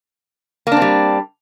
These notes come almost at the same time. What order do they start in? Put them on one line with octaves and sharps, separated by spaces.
A#3 D4 C4 G3